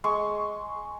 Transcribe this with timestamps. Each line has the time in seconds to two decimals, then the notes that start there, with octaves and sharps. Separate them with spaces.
0.04 G#3 C6 C#6